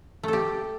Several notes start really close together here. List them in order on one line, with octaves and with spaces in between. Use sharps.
A3 A4 G4